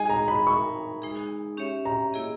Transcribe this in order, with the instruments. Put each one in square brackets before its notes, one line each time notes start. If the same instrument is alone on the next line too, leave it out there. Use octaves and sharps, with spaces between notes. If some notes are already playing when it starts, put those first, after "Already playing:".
Already playing: [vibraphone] G#3 D#4 G#4 D#5 [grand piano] G#5
[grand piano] A#5
B5
[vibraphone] D#4 A#4 E5 [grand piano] C#6
[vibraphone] G#3 D#4 G#4
C#4 G4 C#5 E5
[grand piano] A#5
[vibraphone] A#3 E4 G#4 D#5